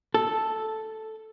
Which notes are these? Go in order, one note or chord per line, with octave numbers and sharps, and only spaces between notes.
A4